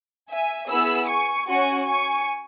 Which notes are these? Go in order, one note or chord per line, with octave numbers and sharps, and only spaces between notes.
E5 G#5
B3 E4 G#4 B5 E6
G#5 C#6
C#4 F#4 G#5 C#6
G#5 C#6